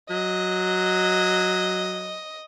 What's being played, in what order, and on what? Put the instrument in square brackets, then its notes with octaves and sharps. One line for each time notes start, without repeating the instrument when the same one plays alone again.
[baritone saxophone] F#3 [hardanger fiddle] D#5